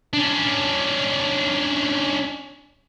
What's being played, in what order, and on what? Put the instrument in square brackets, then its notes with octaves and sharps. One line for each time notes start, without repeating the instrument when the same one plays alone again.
[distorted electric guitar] C#4 D4